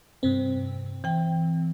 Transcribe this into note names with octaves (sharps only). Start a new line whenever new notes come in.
G2 C3 C4
E3 C4 G5